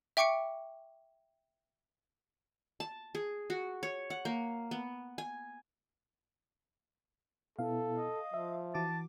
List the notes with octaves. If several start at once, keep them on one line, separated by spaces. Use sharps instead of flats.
E5 G5 C#6 D6 C#7 D7
A5
G#4
F#4
C#5
F#5
A#3
B3
G#5
B2 B3 E4 A4 F5
D#5
F3 E5
E3 F#4 A5 D6